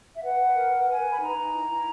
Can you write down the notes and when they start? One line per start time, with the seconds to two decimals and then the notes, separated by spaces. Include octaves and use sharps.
0.15 E5
0.23 B4 F#5
0.39 B4
0.56 A#4
0.72 A#4
0.89 B4 G#5
1.05 B4
1.12 B5
1.21 D#4 A#5
1.36 D#4
1.53 E4
1.69 E4